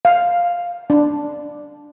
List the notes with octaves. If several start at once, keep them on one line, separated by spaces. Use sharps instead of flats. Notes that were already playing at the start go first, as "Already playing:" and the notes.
F5
D4